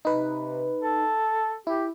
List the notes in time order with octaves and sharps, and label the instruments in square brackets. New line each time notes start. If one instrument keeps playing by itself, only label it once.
[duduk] C3 [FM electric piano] D#4 B4
[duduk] A4
[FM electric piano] E4 [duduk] G4